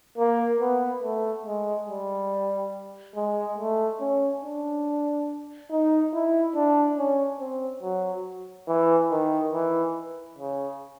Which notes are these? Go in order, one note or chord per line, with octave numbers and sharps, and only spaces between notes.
A#3
B3
A3
G#3
G3
G#3
A3
C#4
D4
D#4
E4
D4
C#4
C4
F#3
E3
D#3
E3
C#3